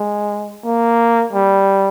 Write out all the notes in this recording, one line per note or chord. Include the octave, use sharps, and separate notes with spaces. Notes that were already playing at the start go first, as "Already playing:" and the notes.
Already playing: G#3
A#3
G3